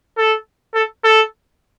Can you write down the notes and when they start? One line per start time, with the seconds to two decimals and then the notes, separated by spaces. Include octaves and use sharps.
0.18 A4
0.75 A4
1.04 A4